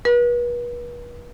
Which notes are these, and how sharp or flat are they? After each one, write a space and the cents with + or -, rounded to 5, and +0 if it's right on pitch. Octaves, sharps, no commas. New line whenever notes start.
B4 -40